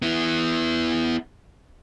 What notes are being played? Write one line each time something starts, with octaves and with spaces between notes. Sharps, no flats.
B3 E4